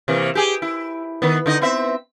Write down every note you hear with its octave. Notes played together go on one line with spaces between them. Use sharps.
C3 E3 A#3
G4 G#4
E4
D#3 B3
D3 D#4 D#5
B3 C4 E5